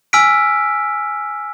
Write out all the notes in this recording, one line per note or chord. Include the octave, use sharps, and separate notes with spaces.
G#5 E6 F6 B6 D7